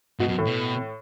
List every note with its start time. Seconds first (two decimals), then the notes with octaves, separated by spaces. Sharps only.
0.19 G#2 B2
0.28 F#2
0.38 A2
0.47 B2